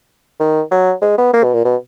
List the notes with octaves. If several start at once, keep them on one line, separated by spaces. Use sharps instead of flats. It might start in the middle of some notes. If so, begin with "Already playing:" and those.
D#3
F#3
G#3
B3
A#3
B2
A#2
B2